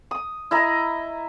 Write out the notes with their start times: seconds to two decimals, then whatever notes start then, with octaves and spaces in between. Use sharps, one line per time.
0.11 D#6
0.51 E4 D#5 A#5